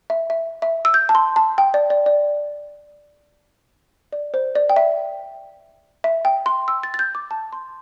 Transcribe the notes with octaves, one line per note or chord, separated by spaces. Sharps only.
E5
E5
E5
E6
G6
A5
C6
A5
G5
D5
D5
D5
D5
C5
D5
G5
E5
E5
G5
C6
E6
A6
A6
G6
D6
A5
C6